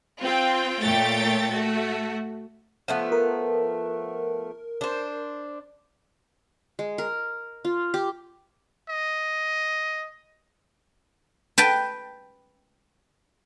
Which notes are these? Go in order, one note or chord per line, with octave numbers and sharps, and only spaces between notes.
C4 F4 G5
A#2 A3 C#5 G5 A6
A3 F#4
F3 A3 B3
A#4
D4 C5
G#3
A#4
F4
G4
D#5
B4 G5 A5